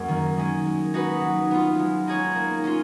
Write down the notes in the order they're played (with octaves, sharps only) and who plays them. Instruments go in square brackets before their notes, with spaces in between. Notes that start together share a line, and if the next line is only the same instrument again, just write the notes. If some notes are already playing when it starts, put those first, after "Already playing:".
Already playing: [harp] F#2 F#3 A#3 C#4 G#4
D#3
G#3 C#4
G#3
D#4 F#4 B4
F#3
B3 F4
G#3
D#4 G#4 C#5
A#3
C#4 F4